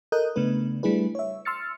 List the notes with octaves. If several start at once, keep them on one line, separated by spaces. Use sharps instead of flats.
A4 A#4 D#5 D#6 F#6 G6
C#3 A3 B3 D4 B4
G3 A3 D4 E4 G#4 B4
C#5 E5
C6 E6 F6 A6 C#7